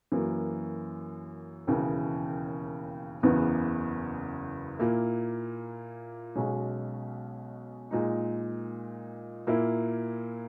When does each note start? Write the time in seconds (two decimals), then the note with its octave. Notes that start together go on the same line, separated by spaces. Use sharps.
0.12 F#2 E3 A#3
1.67 E1 D#2 C#3 E3
3.23 F#1 E2 C#3 E3 B3
4.79 A#2 A#3 E4
6.36 B1 B2 G#3 C#4
7.91 A#2 G#3 D#4
9.47 A#2 A#3 E4